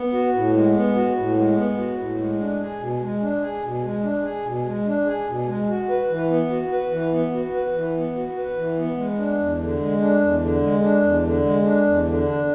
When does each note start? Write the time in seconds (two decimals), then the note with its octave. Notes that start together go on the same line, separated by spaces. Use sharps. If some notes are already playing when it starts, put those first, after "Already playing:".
Already playing: B3
0.13 F#4
0.34 A2
0.54 G#3
0.75 B3
0.95 F#4
1.16 A2
1.36 G#3
1.57 B3
1.77 F#4
1.98 A2
2.19 G#3
2.39 D4
2.60 G#4
2.80 B2
3.01 G#3
3.21 D4
3.42 G#4
3.63 B2
3.84 G#3
4.03 D4
4.24 G#4
4.45 B2
4.66 G#3
4.86 D4
5.07 G#4
5.27 B2
5.47 G#3
5.69 F#4
5.89 B4
6.10 E3
6.29 B3
6.50 F#4
6.71 B4
6.92 E3
7.12 B3
7.33 F#4
7.53 B4
7.74 E3
7.94 B3
8.15 F#4
8.36 B4
8.56 E3
8.77 B3
8.97 G#3
9.17 D4
9.38 E2
9.59 D3
9.80 G#3
10.00 D4
10.21 E2
10.40 D3
10.62 G#3
10.82 D4
11.02 E2
11.24 D3
11.44 G#3
11.64 D4
11.85 E2
12.05 D3
12.26 D4